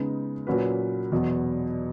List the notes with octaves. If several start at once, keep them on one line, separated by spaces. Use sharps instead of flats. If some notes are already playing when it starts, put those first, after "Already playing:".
Already playing: C#3 G#3 B3 D#4
A#2 F#3 C#4 F#4 B4
E2 B2 F#3